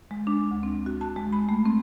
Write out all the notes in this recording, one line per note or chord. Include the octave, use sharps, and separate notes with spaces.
G#3
D4
D2
C4
F#4
A5
G#3
B5
A3
C4